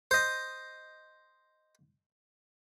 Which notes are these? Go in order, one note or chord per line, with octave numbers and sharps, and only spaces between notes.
C5 D#5